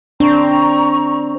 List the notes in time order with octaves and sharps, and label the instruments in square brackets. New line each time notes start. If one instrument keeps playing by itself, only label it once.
[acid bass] C4 [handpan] D4 [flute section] A#5 C#6